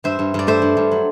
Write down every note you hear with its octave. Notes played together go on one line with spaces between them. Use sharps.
G2 C5 E5
G2
G2 D5
A3 C5 E5
G2
G2
F#3